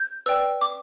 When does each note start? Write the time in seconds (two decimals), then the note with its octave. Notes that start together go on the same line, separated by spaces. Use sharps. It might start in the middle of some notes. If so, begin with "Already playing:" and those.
Already playing: G6
0.26 B4 D5 G5 E6
0.61 D6